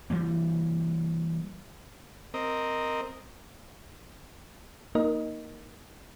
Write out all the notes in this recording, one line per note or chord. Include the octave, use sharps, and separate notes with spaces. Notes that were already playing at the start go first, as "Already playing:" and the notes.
E3 F3 G3 A#3
C4 A#4 D#5
A#3 D#4 A#4 D#5